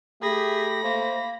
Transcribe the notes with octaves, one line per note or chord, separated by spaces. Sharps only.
A3 G4 G#4 B5 A#6
A#3 C5